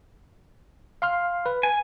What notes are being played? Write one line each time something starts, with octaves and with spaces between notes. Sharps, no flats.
F5 C6 F6
B4
G#5